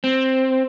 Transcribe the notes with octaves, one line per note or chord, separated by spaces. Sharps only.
C4